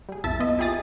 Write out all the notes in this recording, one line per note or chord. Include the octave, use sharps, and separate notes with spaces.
G3 G#4
B1 F2 E4 E5 A5 A6
B3 F4 D#5 E5
E4 F4 G4 G#4 D#6 A6